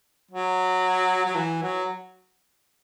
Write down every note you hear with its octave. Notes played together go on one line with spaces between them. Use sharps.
F#3
F#3
E3
F#3